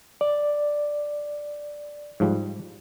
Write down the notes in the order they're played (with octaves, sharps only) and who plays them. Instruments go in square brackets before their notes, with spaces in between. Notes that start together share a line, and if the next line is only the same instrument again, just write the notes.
[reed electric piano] D5
[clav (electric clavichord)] G#2 F3 G3